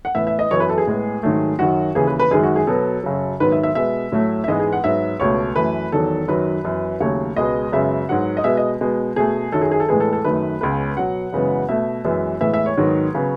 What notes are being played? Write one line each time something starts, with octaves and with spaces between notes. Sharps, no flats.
F#5
A2 E3 B3 E5
E5
D#5
F#2 E3 B3 C#5
B4
A4
G#4
A2 G#3 B3
G#2 D#3 F#3 A3
F#2 D#3 F#3 F#4
D#2 C#3 E3 G#4
B4
B4
F#2 D#3 G#3 G#4
F#4
G#4
B2 F#3 B3 A4
F#2 C#3 F#3
G#2 D#3 F#3 B3 B4
E5
E5
B2 G#3 B3 E5
A2 F#3 A3
E5
G#2 E3 G#3 B3 D#5
G#4
F#5
G#2 F#3 B3 E5
C#2 B2 A3 C#5
F#2 E3 A3 B4
E2 D#3 F#3 A4
F#2 D#3 F#3 B4
F#2 E3 B3
D#2 C#3 F#3 A3 C#5
C#2 B2 G#3 B3 D#5
F#2 C#3 G#3 B3 E5
G#2 F#3 B3 F#5
D#5
B2 G#3 B3 E5
D#5
B2 G#3 B3
B2 A3 G#4
F#2 D#3 F#3 A4
G#4
G#4
A4
A2 E3 G#3 B3 G#4
A4
A4
F#2 D#3 A3 B4
C#2 C#3 G#3 B3 B4
B2 F#3 B3 F#5
F#2 C#3 E3 G#3 B3
B2 A3 E5
F#2 E3 G#3 B3
A2 E3 G#3 B3 E5
E5
C#5
G#2 D#3 F#3 B3
C#3 F#3 B3